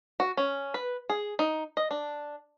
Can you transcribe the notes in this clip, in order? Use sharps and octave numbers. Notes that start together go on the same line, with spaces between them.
F#4
C#4
B4
G#4
D#4
D#5
D4